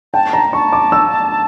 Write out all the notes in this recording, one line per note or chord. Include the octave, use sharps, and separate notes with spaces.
G5 A5
A#5
A5 C#6
D6
E6